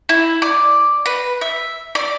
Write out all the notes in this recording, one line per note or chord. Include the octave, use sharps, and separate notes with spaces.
E4
D5
B4
E5
D5